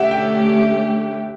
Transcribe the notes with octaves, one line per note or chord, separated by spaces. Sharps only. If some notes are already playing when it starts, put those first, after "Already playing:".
Already playing: D3 A3 C#4 G4 E5 F#5
G5